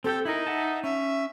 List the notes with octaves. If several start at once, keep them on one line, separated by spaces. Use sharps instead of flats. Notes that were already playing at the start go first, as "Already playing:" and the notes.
C4 G4 A4 G5
D#4 E4 A#4
E5 F#5 A5
C#4 E5